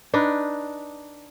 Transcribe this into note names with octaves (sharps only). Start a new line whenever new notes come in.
D4 D#4 B4